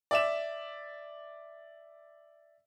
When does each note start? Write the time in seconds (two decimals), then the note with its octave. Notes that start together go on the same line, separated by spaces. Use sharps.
0.11 D5 E5 E7